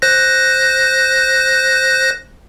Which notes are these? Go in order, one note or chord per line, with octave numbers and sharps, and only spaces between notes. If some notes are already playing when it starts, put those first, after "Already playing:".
C5 F#6 A#6